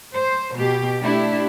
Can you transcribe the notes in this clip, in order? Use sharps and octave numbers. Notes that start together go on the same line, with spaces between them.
C5
B2 G4
A3 D4 E4 G4